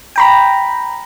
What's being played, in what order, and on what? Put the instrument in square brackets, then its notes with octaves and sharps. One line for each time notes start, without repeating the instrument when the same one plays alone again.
[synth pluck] G5 A#5 B5